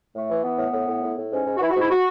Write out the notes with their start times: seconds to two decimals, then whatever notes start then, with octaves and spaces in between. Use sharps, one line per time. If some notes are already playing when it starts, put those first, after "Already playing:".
0.14 A2 A3
0.29 E3
0.43 E3 B3
0.59 A2
0.73 A2
0.88 A2
1.03 A2
1.17 A2
1.32 G#2 C#4
1.46 G#2
1.56 F#4
1.60 E3 E4
1.71 F#4
1.75 G#2
1.81 E4
1.90 F#4